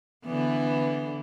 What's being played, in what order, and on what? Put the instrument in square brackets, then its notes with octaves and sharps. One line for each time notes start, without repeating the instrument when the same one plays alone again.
[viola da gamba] D3 E3 B3